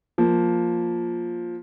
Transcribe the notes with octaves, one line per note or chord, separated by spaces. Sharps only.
F3 A#3